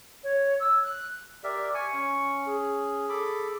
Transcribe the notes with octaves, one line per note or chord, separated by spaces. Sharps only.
C#5
E6
F#6
G4 A#4 D5 E5
G#5 C#6
C#4
G#4
A4 B5 D6